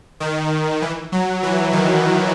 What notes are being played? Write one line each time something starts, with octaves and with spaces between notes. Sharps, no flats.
D#3
E3
F#3
E3
D#3